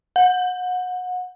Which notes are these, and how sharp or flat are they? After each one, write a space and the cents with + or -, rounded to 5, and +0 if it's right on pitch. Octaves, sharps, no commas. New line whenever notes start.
F#5 -25